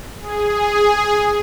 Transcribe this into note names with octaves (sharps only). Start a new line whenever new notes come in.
G#4